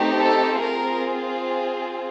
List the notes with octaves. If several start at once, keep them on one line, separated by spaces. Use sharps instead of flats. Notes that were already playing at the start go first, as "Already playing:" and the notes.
Already playing: A3 C4 D#4 G4
A4
C4 F4 G#4 A#4